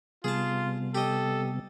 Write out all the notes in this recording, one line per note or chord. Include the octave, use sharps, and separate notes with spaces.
C3 G3 B3 F4 G#4 A5
G4 A4 D#5